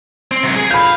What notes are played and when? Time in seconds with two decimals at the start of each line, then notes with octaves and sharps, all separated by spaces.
0.31 C4
0.43 C3 F#3
0.56 G#4
0.71 F5 B5 G6